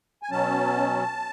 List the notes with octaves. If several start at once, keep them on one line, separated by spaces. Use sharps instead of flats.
G#5
B2 F#3 C#4 A5